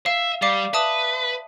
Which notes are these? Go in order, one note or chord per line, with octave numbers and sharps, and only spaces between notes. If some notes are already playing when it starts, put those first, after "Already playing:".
E5 F5
G3 D5 F5 D6
B4 E5 A5 D#6